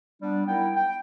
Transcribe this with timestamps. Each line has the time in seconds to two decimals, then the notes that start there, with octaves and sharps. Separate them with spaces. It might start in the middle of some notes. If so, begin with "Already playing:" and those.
0.22 G3 B3 D4
0.46 G3 B3 D#4 E4 A#4 G5
0.76 G5